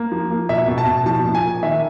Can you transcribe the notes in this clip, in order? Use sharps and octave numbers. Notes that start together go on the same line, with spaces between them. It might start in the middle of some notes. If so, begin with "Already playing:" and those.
Already playing: A#3
F3
A#3
B2 E5
B2
A5
B2
F3 A5
A#2
G#5
A#3
D#3 E5